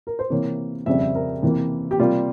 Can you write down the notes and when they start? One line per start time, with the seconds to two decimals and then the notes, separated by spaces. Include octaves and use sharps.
0.07 A#4
0.19 C5
0.30 C3 E3 A#3 C#5
0.86 F2 C#3 G3 C4 E5
1.01 E5
1.15 A#4
1.43 C3 E3 A#3
1.91 G4
1.99 C3 G3 A#3 F4